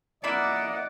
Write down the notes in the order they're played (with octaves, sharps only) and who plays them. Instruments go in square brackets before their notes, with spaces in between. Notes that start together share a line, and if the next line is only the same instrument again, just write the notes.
[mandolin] A#3 E4 [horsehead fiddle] D5 F#5 [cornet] D#5